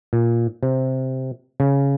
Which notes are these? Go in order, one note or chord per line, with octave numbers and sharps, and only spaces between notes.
A#2
C3
C#3